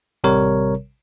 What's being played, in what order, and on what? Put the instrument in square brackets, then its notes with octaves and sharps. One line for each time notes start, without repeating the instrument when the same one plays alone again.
[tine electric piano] A1 C3 G3 A#4 C#5